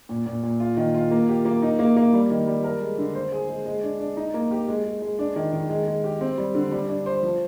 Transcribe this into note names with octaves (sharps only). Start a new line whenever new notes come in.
A#2
A#2
A#2
F4
D#3
F4
A#3
G4
A#3
D#4
A#3
A#3
G3
D#3
G3
A#4
G#3
D3
C5
G#4
G#3
G#3
D4
D4
D#4
A#3
G4
G#3
G#3
G#3
D4
D#3
D#3
G#3
G#3
G4
C4
G3
D3
G3
D4
C5
F3